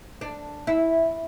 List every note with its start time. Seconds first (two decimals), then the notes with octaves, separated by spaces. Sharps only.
0.21 D4
0.67 E4